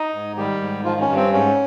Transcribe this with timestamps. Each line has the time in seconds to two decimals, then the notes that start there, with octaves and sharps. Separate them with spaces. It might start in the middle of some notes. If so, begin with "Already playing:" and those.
Already playing: D#4 D#5
0.14 G#2
0.37 D#3 G3 G4
0.61 G#2
0.85 D#3 F3 F4
1.01 C#4
1.09 G2
1.16 C4
1.33 G#2 C#4